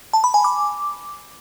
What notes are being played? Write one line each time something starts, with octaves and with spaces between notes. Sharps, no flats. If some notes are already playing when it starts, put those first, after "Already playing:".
A5
B5
G#5
D6